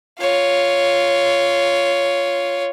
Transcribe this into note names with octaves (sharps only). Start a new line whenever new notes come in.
F4 C#5